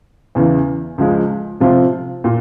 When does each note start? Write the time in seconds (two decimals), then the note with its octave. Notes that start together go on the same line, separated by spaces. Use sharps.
0.35 E2 C#3 E3
0.98 C#2 C#3 F3 G#3
1.60 C3 F3 C4 F4
2.24 A#2